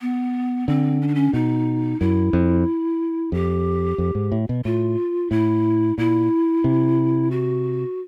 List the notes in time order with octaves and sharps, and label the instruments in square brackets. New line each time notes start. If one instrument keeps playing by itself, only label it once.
[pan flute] B3
[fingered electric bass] D3 [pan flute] C4
[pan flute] C#4
D4
C#4
[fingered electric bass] B2 [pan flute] D#4
[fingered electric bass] F#2 [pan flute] E4
[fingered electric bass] F2
[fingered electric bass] F2 [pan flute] G4
[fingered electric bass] F2
G#2
A2
B2
[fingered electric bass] A2 [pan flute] F4
[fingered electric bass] A2 [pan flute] E4
[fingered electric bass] A#2 [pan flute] E4
[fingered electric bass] C3
[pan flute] F#4